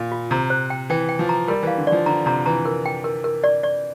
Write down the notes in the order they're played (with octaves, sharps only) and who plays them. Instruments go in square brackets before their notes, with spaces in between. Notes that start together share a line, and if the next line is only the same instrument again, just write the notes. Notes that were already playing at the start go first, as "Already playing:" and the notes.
Already playing: [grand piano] A#2
[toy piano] F4
[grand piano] C3 [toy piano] A#5
[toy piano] C5
G5
[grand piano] E3 [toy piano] G5
[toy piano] G5
[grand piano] F3
[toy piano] A#5
[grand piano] G3 [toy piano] A#4
[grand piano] E3 [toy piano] F5
[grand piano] D3
[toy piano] D5
[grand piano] F3
[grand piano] D3 [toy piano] A#5
[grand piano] C3 [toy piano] A#5
[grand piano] E3 [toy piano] A#5
[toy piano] A#4
G5
A#4
A#4
D5
D5